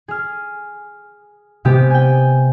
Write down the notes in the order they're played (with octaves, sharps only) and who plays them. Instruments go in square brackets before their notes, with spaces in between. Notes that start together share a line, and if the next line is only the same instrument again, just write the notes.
[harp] G#4 F6
C3 G#3 B3 G4
G5 G#5